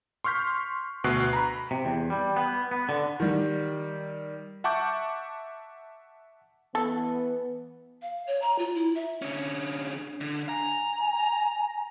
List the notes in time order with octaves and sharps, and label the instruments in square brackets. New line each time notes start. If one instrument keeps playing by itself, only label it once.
[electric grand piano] C6 C#6 F6 G6 B6
D2 B2 C#6 F#6 C7
A#5 B5
[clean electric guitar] C3
E2
G3
B3
B3
D3
[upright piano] D#3 G3
[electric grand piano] E5 F#5 A5 C#6 D6 G6
[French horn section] E3 B3 [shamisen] A4
[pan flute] F5
C#5
A#5
F4
E4
E5
[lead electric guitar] D3 C#4
D3
[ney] G#5 [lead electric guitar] A#5